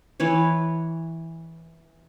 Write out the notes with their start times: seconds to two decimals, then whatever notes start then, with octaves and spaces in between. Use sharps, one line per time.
0.20 E3 B4 C#5